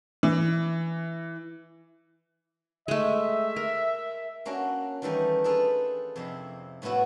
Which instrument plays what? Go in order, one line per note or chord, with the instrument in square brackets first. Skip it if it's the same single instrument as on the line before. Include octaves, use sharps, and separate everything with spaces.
[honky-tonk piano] E3
[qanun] G#3 A3 [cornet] E5
[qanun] A#4
[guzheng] A#3 C#4 D4 F#4
D#3 E3 G3 A3 D#4
D4 D#4 F4 G#4 A4 B4
F2 C3 E4
A2 A3 B3 E4 F#4